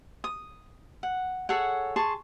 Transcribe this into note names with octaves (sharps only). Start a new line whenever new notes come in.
D#6
F#5
G#4 A4 C#5 F#5
G#4 A5 C6 C#6